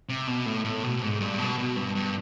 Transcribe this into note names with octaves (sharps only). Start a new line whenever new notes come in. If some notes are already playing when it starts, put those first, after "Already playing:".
C3
B2
A2
A2
B2
G#2
G2
B2
B2
G2
G2